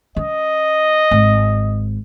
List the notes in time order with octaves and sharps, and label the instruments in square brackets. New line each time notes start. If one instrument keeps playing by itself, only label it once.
[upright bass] C#4 [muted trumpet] D#5
[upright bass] G#1